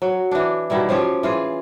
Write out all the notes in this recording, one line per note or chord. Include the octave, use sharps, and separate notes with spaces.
F#3
E3 D4
B2 D#3 G3 E4
F3 C#4 F4 G4
E3 F4 G#4